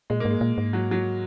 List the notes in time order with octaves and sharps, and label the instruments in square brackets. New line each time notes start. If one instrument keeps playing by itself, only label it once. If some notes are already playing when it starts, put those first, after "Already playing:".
[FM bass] A#2 [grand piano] G#3
[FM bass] G#2 [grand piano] A#3
[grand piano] G#3
[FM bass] A#2
G#2
[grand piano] F#3
F#3